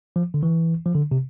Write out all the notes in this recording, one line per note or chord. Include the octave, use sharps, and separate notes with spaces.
F3
D3
E3
F3
D3
C3